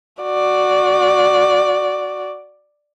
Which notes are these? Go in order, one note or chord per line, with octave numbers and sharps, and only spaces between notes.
F#4 D5